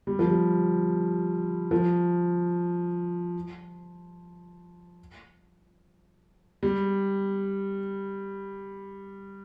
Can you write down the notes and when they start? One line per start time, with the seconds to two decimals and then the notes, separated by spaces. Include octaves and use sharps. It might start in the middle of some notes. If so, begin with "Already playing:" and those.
0.07 G3
0.19 F3
0.30 G3
1.71 F3
6.63 G3